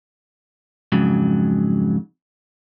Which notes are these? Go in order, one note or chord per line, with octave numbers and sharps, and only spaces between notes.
F2 G#2 C#3 F#3